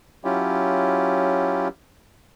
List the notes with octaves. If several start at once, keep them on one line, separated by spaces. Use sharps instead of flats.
F#3 C#4 E4 F4 G4